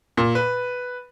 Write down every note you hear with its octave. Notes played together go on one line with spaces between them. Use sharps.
A#2
B4